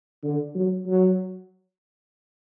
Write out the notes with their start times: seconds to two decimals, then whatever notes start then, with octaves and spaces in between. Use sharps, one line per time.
0.23 D3
0.55 F#3
0.86 F#3